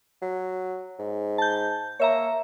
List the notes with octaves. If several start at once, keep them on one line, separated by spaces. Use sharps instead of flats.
F#3
G#2
A5 G6
A#3 C#5 E5 A#5